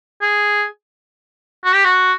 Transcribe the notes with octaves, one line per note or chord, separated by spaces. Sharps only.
G#4
F#4
G4
F#4